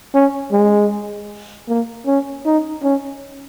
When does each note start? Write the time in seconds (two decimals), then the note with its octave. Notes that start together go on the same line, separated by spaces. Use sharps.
0.15 C#4
0.52 G#3
1.69 A#3
2.07 C#4
2.46 D#4
2.84 C#4